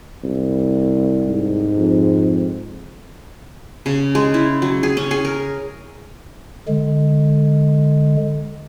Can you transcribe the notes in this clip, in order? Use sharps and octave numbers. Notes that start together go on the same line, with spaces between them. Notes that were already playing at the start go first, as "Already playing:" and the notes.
C2
G#2
F2
C#3
G#3
E4
F#3
G#4
C#4
G#4
A#4
D3 G#3